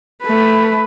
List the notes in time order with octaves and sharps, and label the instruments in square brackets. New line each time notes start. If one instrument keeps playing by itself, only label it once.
[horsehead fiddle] A3 B4